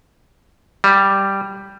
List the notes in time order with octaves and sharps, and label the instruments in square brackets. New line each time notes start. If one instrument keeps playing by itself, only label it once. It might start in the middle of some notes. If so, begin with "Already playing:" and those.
[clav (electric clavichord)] G3